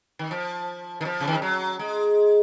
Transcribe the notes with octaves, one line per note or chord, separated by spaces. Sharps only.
D#3
F3
D#3
F3
C#3
D#3
F3
F#3
G#3